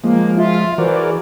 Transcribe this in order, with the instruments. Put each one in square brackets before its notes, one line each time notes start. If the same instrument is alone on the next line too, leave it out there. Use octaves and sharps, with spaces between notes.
[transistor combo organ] F3 G#3 [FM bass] A#3
[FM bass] F4 [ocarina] E5
[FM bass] E3 [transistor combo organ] F#4 A#4 D5 [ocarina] C5
[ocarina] G#4